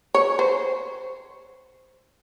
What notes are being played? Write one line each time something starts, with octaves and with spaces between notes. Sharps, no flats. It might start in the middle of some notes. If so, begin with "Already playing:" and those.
C#5
C5